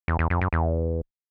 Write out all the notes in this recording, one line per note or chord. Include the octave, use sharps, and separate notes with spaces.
E2
E2
F2
F#2
E2